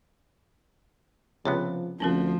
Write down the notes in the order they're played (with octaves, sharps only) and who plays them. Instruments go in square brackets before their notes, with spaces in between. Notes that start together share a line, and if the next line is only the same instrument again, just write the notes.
[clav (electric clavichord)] C#2 C3 B3 [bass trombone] F3 [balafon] C#5
[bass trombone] D2 [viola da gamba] F3 [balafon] C4 C#4 A#4